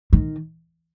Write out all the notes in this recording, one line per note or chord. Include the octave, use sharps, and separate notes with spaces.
D#3